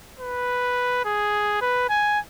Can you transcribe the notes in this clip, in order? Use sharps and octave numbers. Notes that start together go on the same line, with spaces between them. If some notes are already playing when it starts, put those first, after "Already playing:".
B4
G#4
B4
G#5